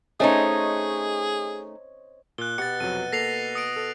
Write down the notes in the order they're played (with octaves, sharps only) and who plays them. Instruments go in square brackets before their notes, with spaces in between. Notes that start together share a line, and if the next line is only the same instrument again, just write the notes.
[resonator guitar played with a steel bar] A3 C#4 D#4 [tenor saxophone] G#4 [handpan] C5 C#5 D#5
[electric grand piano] A#2 [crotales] F#6 G7
[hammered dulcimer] B2 [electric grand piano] G4 [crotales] A6 C#7
[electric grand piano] F2 C3 F#3 [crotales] D#7
[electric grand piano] A#3 A4 [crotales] A#6 C7 F7
[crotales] D#6 C#7 D7
[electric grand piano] A4